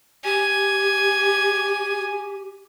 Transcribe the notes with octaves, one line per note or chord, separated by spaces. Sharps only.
G4 G#5